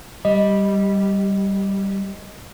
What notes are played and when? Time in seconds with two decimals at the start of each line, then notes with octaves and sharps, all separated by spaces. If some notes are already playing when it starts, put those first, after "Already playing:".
0.25 G3 D#5